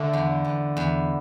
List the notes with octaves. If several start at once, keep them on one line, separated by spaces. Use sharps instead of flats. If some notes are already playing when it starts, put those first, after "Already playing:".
Already playing: D3 A3
E2
E2
E2